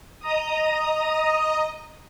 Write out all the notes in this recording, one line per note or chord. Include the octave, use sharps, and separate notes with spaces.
D#5 A#5 D#6